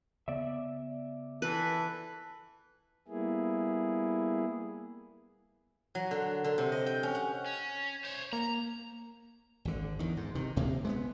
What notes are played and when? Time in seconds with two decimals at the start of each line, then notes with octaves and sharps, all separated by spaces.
0.28 C#3 B3 D5 E5
1.42 E3 A4 B4
3.08 G3 A#3 B3 E4 G#4
5.95 F#3
6.11 D3
6.44 D3
6.58 C3
6.72 D#5
6.86 G5
7.03 C#4
7.15 F#5
7.46 C#4
8.04 C5 C#5
8.33 A#3 A#5
9.65 G#1 D3
9.99 E2 D#3
10.17 G#2
10.35 C3 D#3
10.56 D1 D2 C3 A#3
10.85 G#3 A3 B3